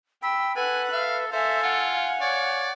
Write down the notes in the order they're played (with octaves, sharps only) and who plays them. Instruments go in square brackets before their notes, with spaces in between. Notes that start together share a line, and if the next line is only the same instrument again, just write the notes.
[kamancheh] G5 [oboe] B5 [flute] E6
[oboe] A4 [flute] B4 [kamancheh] F#5 F#6 [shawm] G#5
[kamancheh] E5 [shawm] F5
[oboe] A4 [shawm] C5 [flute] E5 [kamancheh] F5 G#5
[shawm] F4 [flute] F#5
[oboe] C#5 [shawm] D5